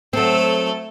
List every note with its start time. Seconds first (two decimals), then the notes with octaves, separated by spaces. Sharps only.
0.13 F#3 A3 C4 A4